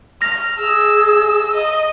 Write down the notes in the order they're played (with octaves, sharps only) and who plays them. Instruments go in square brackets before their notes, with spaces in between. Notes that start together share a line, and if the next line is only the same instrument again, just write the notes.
[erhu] F6 [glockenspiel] A#6
[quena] G#4 [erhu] E6
[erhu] D#5